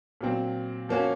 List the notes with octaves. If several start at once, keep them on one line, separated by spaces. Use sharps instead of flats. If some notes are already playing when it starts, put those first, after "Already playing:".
A#2 F#3 C4
F3 A#3 C#4 F#4